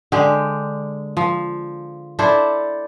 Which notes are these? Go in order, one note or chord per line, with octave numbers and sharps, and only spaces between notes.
D3 G#3 G4
F3
D4 E4 A4 C5